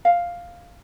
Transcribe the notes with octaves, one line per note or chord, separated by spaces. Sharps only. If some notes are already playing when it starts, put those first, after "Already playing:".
F5